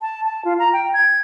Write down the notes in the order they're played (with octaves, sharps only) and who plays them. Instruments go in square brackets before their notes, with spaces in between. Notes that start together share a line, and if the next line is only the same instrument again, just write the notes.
[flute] A5
A5
F4
A#5
G5
G#6